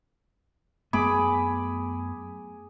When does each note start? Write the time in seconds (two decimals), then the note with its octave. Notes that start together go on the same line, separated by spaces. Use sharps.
0.93 F#2 A3 B3 G#4 B5 D6